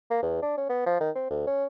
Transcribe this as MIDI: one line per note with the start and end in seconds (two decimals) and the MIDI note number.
0.10 0.19 58
0.22 0.42 40
0.42 0.56 62
0.57 0.65 61
0.69 0.85 59
0.86 0.96 53
1.00 1.10 51
1.15 1.29 60
1.30 1.46 38
1.47 1.66 61